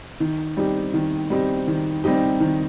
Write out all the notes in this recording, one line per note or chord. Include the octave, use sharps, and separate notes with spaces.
D#3
G3 C4 D#4 G4
D#3
G3 C4 D#4 G4
D#3
G3 C4 D#4 G4
D#3